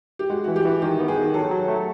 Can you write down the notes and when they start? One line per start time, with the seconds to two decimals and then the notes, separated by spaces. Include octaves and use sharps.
0.19 G4
0.30 G#3 F#4
0.44 E3 F#4
0.56 G4
0.65 E3
0.82 D#3 G4
1.00 B3
1.08 G#4
1.17 D#3
1.34 F#3 A4
1.51 F#3
1.68 A3